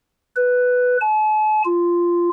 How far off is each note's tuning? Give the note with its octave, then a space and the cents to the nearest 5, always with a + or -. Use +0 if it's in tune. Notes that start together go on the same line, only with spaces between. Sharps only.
B4 +5
A5 -45
F4 -10